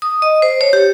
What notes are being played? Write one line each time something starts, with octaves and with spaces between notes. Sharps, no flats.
D#6
D#5
C5
C#5
G4